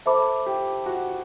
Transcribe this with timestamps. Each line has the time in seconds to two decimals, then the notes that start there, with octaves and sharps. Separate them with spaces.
0.06 A4 C5 E5 B5 D6
0.46 G4
0.86 F#4